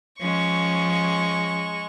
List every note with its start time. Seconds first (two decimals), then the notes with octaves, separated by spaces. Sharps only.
0.20 F3 G#3 C#4 C#6